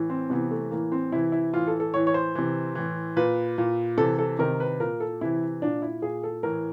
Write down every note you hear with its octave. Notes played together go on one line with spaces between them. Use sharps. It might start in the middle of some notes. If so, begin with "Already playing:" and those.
Already playing: A2 E3
C4
C3 E3 B3
A3
A2 E3 A#3
C4
C3 E3 E4
E4
A2 E3 F4
A4
A4
A2 E3 C#5
C#5
C5
C3 E3
A2 E3
A#2 B4
A#2
C3 E3 A4
A4
C3 D#3 A#4
B4
A#2 A#4
A4
C3 E3 E4
A#2 D4
E4
A#2 G#4
A4
A2 E3 A#4